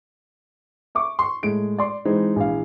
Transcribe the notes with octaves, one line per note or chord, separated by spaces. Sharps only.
E5 C#6 D6
C6 C#6
A2 G#3 D7
D5 C6
E3 G#3 C4 D#4
A#1 E3 F5